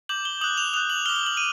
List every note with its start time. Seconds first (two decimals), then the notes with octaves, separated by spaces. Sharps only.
0.09 D6 G6 F#7
0.25 G7
0.41 D#6 F#6 F#7
0.57 F7
0.74 D#6 F#6 F7
0.90 F#7
1.06 F6 G7
1.09 D6
1.16 G7
1.26 F#7
1.37 D#7